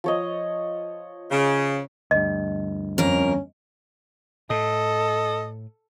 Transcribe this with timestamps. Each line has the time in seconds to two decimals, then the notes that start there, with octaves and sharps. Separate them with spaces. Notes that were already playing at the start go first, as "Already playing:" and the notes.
0.04 F3 C#5 D#5
1.31 C#3
2.11 D2 G2 D#5
2.98 F2 C#4 A#4
4.50 A2 A4 D#5